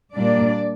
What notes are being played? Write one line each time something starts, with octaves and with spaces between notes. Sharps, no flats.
A#2 G3 A#3 D4 D5